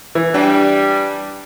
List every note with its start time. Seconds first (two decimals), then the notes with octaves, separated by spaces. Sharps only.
0.15 E3
0.34 G3 D4